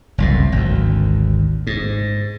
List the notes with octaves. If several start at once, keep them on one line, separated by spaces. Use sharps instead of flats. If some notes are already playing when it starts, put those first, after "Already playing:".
F#1 C2 A2
G#1 D2
G#2